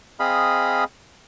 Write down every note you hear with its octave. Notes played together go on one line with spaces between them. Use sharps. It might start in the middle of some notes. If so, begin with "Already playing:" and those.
C4 G#4 D#5 F5 B5